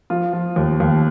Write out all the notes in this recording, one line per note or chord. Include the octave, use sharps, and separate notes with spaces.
F3 F4
F3
D#2
D#2